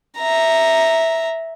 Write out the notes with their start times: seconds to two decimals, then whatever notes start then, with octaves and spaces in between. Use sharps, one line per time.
0.18 E5 A#5